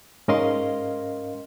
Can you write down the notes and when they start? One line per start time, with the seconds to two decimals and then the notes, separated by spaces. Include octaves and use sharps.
0.28 G#2 C#4 A#4 D#5 F5 C6